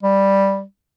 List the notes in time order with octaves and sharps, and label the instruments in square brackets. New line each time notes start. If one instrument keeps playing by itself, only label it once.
[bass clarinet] G3